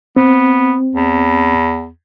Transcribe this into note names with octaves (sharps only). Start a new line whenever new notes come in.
B3 C4
E2